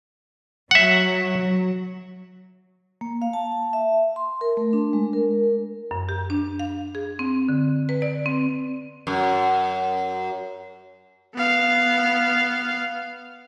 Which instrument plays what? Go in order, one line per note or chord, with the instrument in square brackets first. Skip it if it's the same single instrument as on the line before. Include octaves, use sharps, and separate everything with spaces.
[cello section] F#3 [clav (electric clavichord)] E5 F#5
[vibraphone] A#3
F5
A5
E5
C6
A#4
A3
D4
G#3
A#4
[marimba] F#2
G4
D4
F5
G#4
C4
D3
B4
D5
C4
[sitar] F#2
[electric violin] B3 F5